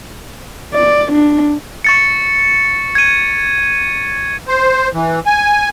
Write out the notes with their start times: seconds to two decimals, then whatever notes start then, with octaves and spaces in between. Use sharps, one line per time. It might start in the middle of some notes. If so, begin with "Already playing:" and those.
0.74 D5
1.12 D4
1.84 C#6 A6 C#7
2.95 G#6 D#7
4.48 C5
4.94 E3
5.26 G#5